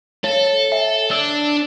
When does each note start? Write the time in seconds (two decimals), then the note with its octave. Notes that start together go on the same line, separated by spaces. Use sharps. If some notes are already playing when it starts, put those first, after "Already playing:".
0.24 A4 C#5
0.72 E5
1.11 D4 E6